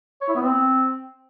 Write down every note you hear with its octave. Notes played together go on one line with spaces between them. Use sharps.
C#5
E4
B3
C4